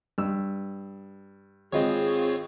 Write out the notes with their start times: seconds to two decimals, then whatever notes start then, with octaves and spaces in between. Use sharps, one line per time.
0.18 G2 E6
1.72 G#1 C4 F4 G#4 C#5 D#5